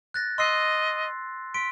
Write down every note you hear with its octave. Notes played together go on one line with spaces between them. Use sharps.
F#6 A6 A#6
D#5 C6 E6 C7
C6 B6 D7